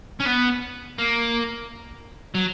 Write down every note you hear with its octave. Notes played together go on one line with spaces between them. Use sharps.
C#4
B3
A#3
F#3